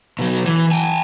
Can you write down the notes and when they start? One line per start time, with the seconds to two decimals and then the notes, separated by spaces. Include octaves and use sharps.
0.19 B2 F#3
0.45 E3
0.72 G5 G#5